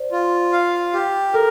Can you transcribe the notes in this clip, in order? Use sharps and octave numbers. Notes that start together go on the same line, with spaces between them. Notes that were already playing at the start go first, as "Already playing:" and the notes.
Already playing: C5 D5
F4
F5
G4
A4 A#4